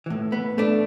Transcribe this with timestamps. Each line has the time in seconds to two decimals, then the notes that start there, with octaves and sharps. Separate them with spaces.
0.06 A2 E3
0.32 B3
0.58 A3 D4